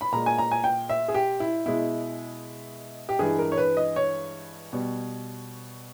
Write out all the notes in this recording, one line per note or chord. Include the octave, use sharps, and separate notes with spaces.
B5
A#2 G#3 A#5
G#5
A#5
G#5
G5
E5
G#4
G4
E4
B2 G#3 E4
G4
G2 E3 G#3 G#4
A#4
C#5
B4
D#5
C#5
B2 G3